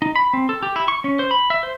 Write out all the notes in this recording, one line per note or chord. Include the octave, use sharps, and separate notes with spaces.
D#4
B5
C4
A4
G4
E4
C#6
C#4
C5
B5
E5
C5